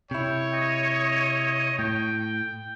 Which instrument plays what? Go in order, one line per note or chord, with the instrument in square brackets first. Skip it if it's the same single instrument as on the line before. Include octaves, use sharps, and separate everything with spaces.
[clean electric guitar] C3 E4 [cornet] C#5 [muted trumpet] G5
[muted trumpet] D#5
[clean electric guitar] A2 [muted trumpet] G5